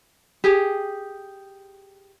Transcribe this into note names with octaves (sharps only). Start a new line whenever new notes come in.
G4 G#4